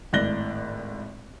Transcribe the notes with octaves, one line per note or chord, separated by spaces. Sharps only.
G#1 A2 D5 F#6 A#6 G7